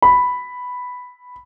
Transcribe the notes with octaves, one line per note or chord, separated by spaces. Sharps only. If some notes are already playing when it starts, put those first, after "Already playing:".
B5